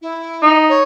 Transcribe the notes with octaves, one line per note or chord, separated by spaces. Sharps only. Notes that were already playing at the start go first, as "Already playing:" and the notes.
E4
D#4
C#5